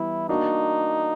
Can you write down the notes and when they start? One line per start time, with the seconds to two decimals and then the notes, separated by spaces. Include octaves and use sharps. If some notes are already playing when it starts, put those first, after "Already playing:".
Already playing: E3 G3 B3 E4
0.29 A#3 D4 D#4 F#4